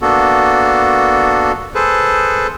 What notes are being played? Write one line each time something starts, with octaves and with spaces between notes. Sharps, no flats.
A#3 B3 D4 F#4 A4
G#4 A4 B4 C5